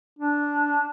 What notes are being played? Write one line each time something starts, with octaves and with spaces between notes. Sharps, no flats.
D4